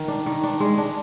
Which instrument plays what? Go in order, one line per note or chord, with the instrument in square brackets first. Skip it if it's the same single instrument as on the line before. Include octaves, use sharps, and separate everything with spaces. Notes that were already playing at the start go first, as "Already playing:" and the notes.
Already playing: [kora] D#3
D4
D#3
D4
G#3
D4